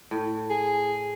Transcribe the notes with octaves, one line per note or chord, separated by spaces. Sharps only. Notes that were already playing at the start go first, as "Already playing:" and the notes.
A2
G#4